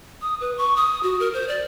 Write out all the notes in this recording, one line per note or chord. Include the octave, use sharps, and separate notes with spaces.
D#6
B4
C#6
D#6
F#4
A#4
C5
D5